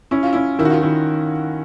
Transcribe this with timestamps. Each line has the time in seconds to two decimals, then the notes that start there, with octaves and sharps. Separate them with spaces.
0.11 C#4 E4
0.23 F4
0.33 C#4 E4
0.59 D#3 E4
0.65 F#4
0.70 F4
0.83 D#3 E4